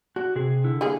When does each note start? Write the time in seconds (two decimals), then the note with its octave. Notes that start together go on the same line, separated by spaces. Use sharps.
0.16 D4 F#4
0.36 C3 G#4
0.64 D3 E4
0.81 G3 A#3 G#4